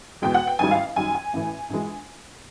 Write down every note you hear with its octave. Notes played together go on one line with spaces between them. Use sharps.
E2 B2 G#3 G5
F#5
G5
A1 G#2 D#3 G3 G#5
F5
F#2 D#3 G3 G#5
G#5
A1 A2 E3
A#1 E3 G#3